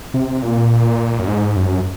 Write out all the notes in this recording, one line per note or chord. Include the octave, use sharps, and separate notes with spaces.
C3
A#2
F#2
G#2
F#2